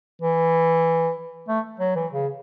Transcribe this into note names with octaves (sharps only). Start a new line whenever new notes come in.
E3
A3
F#3
E3
C#3